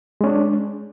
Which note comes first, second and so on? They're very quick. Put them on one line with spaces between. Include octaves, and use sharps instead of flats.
G#3 C#4 D4